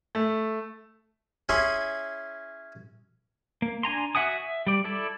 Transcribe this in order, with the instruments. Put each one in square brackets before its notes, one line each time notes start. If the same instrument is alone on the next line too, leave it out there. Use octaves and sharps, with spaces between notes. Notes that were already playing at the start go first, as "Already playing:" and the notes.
[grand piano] A3
[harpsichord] C#4 E4 G#4 G#5 B5 C6
[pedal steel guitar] A#3
D4 G#5 A#5 C6
F#4 E5 F#5 G#5 D#6
E5
G3 D5
E4 A4 D5